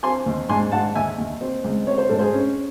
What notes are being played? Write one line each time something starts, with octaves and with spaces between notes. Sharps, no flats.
C4 G#5 C6
D#2
G#2 G#5 C6
G#2 F#5 A5
D#2 E5 G#5
D#2
C4
C#2
C4 C#5
C5
G#2 A4
G#4 C5
C#4